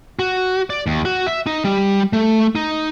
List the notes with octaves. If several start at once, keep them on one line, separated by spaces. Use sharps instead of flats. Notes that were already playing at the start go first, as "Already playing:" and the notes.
F#4
D5
D#2
F#4
E5
D#4
G3
A3
D#4